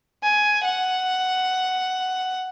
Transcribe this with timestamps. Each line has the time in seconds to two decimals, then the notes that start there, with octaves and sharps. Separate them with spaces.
0.23 G#5
0.64 F#5